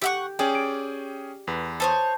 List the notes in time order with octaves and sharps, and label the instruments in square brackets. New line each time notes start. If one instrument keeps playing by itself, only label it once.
[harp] G4 [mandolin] E5 F#5 C#6
[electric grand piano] C#4 G#4 G5 [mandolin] D5
[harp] D7
[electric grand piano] E2 [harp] B4
[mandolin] A4 C5 C#5 [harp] A5 D#6 G6